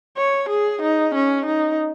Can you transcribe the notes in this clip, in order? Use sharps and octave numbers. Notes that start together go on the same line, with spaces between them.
C#5
G#4
D#4
C#4
D#4